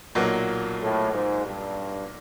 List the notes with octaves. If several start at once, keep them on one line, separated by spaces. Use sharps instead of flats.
B1 A#2 F#3 A#3
A2
G#2
G2